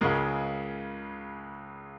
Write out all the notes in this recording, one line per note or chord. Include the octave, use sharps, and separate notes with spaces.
C#2 C#3 G#3 A#4